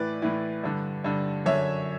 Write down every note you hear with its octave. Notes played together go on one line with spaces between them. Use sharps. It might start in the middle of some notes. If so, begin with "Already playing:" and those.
Already playing: A2 E3 B4 D5
A2 E3
G2 D3
G2 D3
F#2 D3 C#5 E5